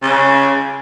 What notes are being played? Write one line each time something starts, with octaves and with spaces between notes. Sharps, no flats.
C#3